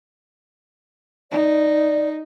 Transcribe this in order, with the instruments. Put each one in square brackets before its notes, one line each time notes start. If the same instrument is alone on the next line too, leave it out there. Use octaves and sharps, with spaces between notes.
[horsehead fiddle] D#4 [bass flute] D5